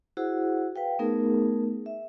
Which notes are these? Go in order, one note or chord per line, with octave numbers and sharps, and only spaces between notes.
E4 F#4 G#4 C5 F#5
B4 F5 G5
A3 B3 D#4 G#4 A#4
E5